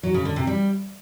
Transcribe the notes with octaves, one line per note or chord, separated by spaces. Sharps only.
F#3
C#3
D3
C3
G3